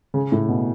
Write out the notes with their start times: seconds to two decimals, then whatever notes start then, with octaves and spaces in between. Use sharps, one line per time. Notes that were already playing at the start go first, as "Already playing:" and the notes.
0.14 C#3
0.32 A2
0.48 B2